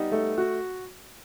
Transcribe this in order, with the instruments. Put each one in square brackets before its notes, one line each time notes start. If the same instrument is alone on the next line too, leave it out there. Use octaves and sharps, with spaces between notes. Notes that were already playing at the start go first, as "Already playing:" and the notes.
Already playing: [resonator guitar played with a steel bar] G3 B3 [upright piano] D#4
[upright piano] A3
F#4